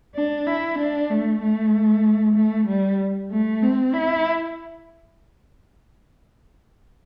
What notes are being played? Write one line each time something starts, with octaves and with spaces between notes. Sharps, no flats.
D4
E4
D4
A3
A3
A3
G3
A3
C4
E4